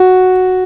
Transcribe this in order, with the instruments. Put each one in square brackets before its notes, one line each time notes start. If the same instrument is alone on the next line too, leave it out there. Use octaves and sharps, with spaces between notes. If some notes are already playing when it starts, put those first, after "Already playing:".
Already playing: [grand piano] F#4